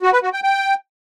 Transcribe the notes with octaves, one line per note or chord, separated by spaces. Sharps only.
F#4
B4
F#4
G5
G5